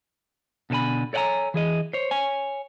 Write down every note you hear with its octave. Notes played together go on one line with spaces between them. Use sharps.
B2 D3 A4 G#5 B5
A4 C#5 D5 F#5 G#5 A#5
E3 G#4 D#5
C5 C#5
C#5 G#5